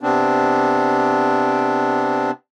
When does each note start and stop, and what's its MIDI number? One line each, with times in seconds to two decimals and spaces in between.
0.01 2.31 48
0.01 2.31 59
0.01 2.31 60
0.01 2.31 62